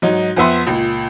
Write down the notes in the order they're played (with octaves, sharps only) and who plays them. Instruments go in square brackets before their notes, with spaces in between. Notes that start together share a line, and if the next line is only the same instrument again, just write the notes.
[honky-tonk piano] G#2 F#3 D#4
F2 B3 E5 C6
C#2 A#2